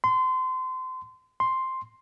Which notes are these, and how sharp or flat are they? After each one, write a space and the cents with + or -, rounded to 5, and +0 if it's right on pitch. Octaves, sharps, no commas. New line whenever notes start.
C6 -25
C6 +5